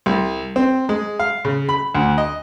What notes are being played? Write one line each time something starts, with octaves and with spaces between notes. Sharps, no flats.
C2
C4
G#3
F5
C#3
B5
D2
D#5